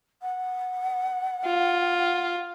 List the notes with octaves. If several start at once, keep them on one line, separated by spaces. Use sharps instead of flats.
F#5
F4